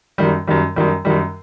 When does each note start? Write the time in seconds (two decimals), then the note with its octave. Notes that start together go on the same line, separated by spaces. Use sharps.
0.18 F#2 D#3 G3
0.47 F#2 D#3 G3
0.76 F#2 D#3 G3
1.05 F#2 D#3 G3